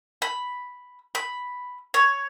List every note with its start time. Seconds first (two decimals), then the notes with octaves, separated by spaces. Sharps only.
0.22 B5
1.15 B5
1.94 C#5